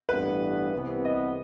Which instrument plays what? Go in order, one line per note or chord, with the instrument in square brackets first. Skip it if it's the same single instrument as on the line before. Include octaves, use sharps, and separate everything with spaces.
[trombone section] A1 G2 E3 B3 [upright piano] B4
[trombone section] C2 C3 E3 B3
[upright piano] D#5